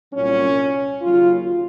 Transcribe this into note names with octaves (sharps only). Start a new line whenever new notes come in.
C2 A#2 F#3 C#4
D#2 C#3 F#3 F4